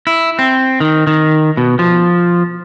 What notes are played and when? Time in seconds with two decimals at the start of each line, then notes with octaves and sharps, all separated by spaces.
0.07 E4
0.39 C4
0.80 D#3
1.07 D#3
1.57 B2
1.79 F3